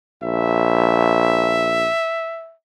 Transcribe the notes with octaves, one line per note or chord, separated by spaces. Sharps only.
A#1 E5